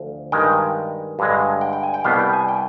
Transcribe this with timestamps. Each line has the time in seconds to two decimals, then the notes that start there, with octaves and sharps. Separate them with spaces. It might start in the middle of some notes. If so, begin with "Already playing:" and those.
Already playing: D2 F3
0.32 G2 D#3 G#3 G5
1.19 G2 D3 G#3
1.61 G5
1.73 G5
1.83 G#5
1.94 G5
2.04 C2 B2 G3 B3 F5
2.19 G5
2.33 G#5
2.48 G5